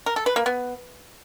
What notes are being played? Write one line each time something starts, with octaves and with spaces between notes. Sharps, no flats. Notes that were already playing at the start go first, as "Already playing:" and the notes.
A#4
A4
B4
A#3
B3